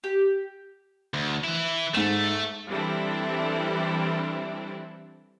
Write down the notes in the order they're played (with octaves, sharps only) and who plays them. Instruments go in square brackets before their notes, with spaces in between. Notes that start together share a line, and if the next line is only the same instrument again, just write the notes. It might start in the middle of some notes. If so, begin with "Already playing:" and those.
[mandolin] G4
[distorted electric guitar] D2
E3 E4
[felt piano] G#2 E7 [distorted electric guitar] A3
[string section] E3 G3 C4 D4 E4 A4